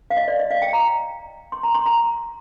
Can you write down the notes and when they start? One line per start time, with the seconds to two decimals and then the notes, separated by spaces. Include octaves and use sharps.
0.10 F5
0.17 D#5
0.28 D5
0.39 D#5
0.51 F5
0.62 G5
0.73 A#5
1.52 C6
1.63 A#5
1.74 C6
1.86 A#5